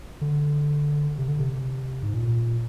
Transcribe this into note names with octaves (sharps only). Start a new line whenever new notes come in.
D3
C3
D3
C3
G#2
A#2